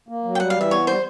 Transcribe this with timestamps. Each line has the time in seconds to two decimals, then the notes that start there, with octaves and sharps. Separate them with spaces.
0.09 A#3
0.24 F#3
0.35 G5
0.40 G3 F#5
0.50 F5
0.56 E3 E5
0.71 B3 C#5
0.87 G3 C5